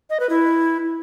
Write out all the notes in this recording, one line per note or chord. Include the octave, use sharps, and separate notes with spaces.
D#5
B4
E4